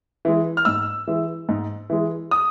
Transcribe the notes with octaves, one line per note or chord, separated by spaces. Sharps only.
E3 G#3
F6
G#2 E6
E3 G#3
G#2
E3 G#3
D#6